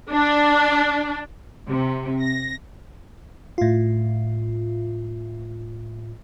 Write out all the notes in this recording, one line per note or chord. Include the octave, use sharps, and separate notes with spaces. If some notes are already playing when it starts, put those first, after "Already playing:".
D4
C3
A#6
A2 F4